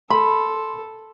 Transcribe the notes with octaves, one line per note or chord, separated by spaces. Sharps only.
A4 B5 C6